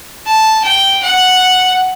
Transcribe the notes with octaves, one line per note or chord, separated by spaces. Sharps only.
A5
G5
F#5